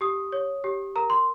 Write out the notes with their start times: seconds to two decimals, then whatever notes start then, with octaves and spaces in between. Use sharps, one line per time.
0.01 G4 D#6
0.32 C#5
0.64 G4
0.96 A#4 A#5
1.10 C6